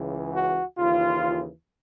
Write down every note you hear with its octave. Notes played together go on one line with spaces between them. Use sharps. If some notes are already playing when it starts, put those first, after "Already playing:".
Already playing: C#2 C#3 E3
F#4
D#2 C#3 E3 F4